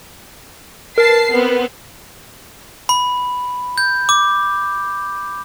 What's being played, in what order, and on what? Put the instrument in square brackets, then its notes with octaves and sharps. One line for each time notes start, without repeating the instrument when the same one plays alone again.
[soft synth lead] A#4 [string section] B4 A5 C7
[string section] B3 C4
[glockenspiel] B5
G6
D6